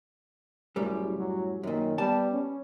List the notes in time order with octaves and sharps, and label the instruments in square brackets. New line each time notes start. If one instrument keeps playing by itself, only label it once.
[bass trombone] F#1 [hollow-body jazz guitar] F#2 A2 G3
[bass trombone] F#3
[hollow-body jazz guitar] F#2 A#2 [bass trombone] D#3
[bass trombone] G3 [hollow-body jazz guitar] B3 D5 A5
[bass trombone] C#4